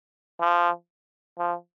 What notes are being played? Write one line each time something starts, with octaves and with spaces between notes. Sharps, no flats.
F3
F3